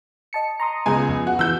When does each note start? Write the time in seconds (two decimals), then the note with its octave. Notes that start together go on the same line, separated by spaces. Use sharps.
0.33 D#5 A5 C#7
0.60 A#5 C6 D#6
0.86 C#2 G#3 B3 F4 G#5
1.08 F2
1.27 F#4
1.39 E3 E6 G6